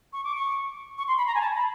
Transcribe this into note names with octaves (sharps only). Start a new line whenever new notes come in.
C#6
D6
C#6
C#6
C6
B5
A#5
G#5
A5
B5